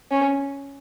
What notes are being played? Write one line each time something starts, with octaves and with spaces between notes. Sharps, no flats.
C#4